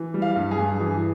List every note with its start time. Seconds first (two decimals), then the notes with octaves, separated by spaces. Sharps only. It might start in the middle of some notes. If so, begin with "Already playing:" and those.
Already playing: E3
0.14 G3
0.22 F5
0.36 G2
0.51 G#4
0.58 G2
0.80 E3 G#4